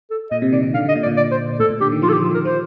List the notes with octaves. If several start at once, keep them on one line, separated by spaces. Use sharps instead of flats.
A4
A#2 D#5
C3
D#3 D5
D#3
D3 F5
D3
D#5
A#2
D5
A#2
D5
C5
A2 A4
A#2
D3 G4
D#3
F3 F4
A4
G4
F3
F4
D#3
A#4
F3 C5